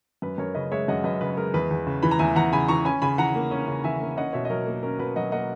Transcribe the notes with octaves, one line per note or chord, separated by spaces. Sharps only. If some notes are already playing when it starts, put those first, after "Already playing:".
F#2 B4
F#2 A#4 C#5
C#3 B4 D#5
G#3 C#5 E5
F#2 D#5 F#5
F#2 B4 D#5
C#3 B4
G#3 A#4
E2 B4
E2
C#3
E3 B5
A#5
E2 E5 G#5
E2 F#5 A#5
C#3 G#5 B5
E3 A#5 C#6
C#4 G#5 B5
C#3 G#5 B5
E3 F#5 A#5
A#3
C#4
C#3
E3 E5 G#5
A#3
C#4 D#5 F#5
B2 C#5 E5
D#5
F#3 A#4 C#5
A#3
C#4 A#4
B2 B4
F#3 D#5 F#5
A#3 D#5 F#5